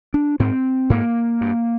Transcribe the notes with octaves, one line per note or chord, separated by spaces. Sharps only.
D4
G#2 C4
G#2 A#3
G2